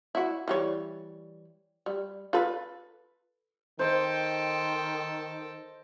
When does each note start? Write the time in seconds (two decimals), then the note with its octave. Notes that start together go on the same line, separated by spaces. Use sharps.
0.15 E4 F#4
0.48 E3 G3 C#5
1.86 G3
2.33 F4 A4 B4
3.79 D#3 A4 C5 D#5 G5